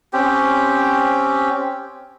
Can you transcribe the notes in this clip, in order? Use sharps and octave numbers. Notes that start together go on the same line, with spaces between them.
C4 C#4 G4